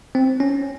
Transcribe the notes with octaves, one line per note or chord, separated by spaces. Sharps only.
C4
C#4